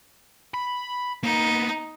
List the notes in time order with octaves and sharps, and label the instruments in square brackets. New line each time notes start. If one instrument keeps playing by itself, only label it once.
[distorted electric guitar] B5
[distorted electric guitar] A#3 B3 [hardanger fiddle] D#4